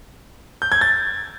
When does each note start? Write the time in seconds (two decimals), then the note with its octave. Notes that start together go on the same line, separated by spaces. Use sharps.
0.62 G6
0.72 G#6
0.81 A6